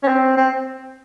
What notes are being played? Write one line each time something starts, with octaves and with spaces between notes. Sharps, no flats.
C#4
C4
C4